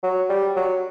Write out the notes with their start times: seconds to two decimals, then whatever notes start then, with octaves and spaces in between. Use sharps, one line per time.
0.04 F#3
0.30 G3
0.56 F#3